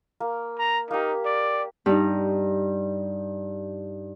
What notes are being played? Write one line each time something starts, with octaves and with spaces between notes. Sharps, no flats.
A#3
A#5
A#3 D#4 G4
D5
G2 D#4